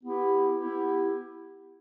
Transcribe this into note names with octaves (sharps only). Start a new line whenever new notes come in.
B3 E4 G4
B3 E4 G4